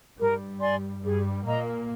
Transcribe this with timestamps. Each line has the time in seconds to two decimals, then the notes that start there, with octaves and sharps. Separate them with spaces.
0.18 G2 G3 A#4
0.60 D5 G#5 C6
1.02 G2 G3 G#4
1.45 A#2 A#3 D#5 A#5